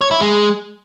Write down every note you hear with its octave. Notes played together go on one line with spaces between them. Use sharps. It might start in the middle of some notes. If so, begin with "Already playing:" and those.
C#5
E4
G#3